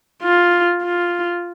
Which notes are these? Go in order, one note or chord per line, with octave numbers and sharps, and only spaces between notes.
F4
F4